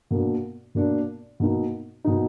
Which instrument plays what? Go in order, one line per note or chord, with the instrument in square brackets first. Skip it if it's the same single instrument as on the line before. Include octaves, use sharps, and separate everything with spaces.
[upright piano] B2 A#3 D4
B2 A#3 D4
B2 A#3 D#4
B2 A#3 D#4